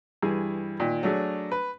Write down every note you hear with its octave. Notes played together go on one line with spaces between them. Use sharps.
G2 E3 G#4
A#2 D#3
F#3 A3 D4 G#4
B4